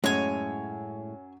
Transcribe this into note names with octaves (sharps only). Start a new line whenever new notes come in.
F#2 A2 G#3 C#5 G#5